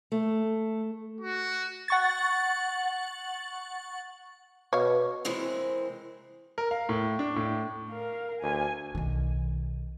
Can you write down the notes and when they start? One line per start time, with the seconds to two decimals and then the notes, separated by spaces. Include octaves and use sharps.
0.12 A3
1.21 F#4
1.88 F#5 C#6 A6
4.73 B2 C#5 F5
5.25 C3 E3 G#3 C4 A#4
6.58 A#4
6.71 F5
6.89 A2
7.19 D4
7.36 A2
7.90 A#4 F5
8.42 D2 G#5
8.95 B1 D#3